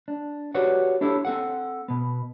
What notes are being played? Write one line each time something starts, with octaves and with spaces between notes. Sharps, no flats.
D4
F#4 G4 B4 C#5 D5 F#5
D4 E4 G4 A4 C#5
C4 A4 F#5
B2 B3